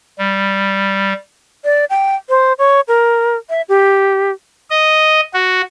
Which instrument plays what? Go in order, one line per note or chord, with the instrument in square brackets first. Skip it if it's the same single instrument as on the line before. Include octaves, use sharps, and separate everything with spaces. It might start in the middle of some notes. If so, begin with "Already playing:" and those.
[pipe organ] G3
[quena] D5
G5
C5
C#5
A#4
E5
G4
[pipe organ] D#5
F#4